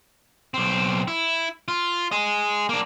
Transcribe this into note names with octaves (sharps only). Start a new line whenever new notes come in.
B1 C4
E4
F4
G#4 D#5
A#3 D4